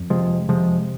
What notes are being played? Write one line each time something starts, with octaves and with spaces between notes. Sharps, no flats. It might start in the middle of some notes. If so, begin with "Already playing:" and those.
Already playing: F2
C3 F3 G#3
C3 F3 G#3